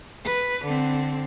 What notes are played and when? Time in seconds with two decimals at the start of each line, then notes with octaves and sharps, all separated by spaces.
0.24 B4
0.64 D3 C4